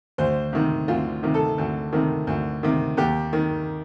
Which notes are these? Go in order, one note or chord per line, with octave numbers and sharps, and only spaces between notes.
D2 C5
C3 D#3
D2 F4
C3 D#3
A4
D2
C3 D#3
D2
C3 D#3
D#2 G4
D#3